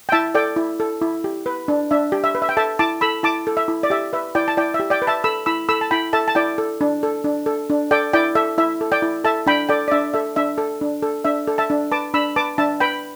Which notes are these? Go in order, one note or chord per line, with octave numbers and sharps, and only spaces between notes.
G5
E4 E5 A5
A4 D5 G5
E4
A4
E4
G4
B4
D4
D4 E5
G4
E5
B4
E5
G5
A4 E5 A5
E4 A5 D6
A4 B5 E6
E4 A5 D6
A4
E5
E4
D5
G4 E5
B4 E5
E4 D5 G5
A5
E4 D5 G5
E5
G4
D5 G5
B4
E5 A5
A4 B5 E6
E4 B5 E6
A4 B5 E6
A5
E4 G5 B5
A4 E5 A5
A5
E4 D5 G5
A4
D4
A4
D4
A4
D4
A4 D5 G5
E4 D5 G5
A4 E5
E4 E5
A4
D5 G5
E4
A4 E5 A5
D4 G5 B5
A4 D5 G5
D5
D4 E5
A4 E5
D4 E5
A4
D4
A4
D4 E5
A4
E5 A5
D4
B4 A5 D6
D4 B5 E6
B4 A5 D6
D4 E5 A5
B4 G5 B5